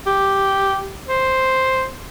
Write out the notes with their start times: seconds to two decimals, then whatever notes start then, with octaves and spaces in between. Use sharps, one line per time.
0.06 G4
1.08 C5